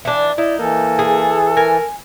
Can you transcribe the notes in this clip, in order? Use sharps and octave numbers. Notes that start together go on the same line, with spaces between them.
E3 D4
D#4 E4 D5
E3 A#3 A4
G#4
A#4 G#5